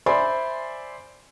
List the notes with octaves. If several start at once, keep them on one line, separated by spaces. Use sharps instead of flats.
C5 D5 E5 G#5 B5 C6